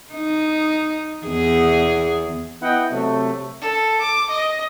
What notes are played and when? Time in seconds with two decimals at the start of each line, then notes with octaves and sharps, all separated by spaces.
0.13 D#4
1.26 E2 G#4
2.62 B3 E4 D#5 F#5 G5
2.91 C3 F#3 A3
3.61 A4
4.00 D6
4.30 D#5